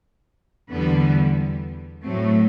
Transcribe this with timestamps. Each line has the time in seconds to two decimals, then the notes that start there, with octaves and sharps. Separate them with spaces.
0.71 E2 D3 G3 B3
2.03 A2 F#3 A3 C4